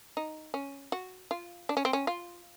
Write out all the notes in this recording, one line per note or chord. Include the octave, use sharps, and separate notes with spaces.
D#4
C#4
F#4
F4
D4
C#4
C4
C#4
F4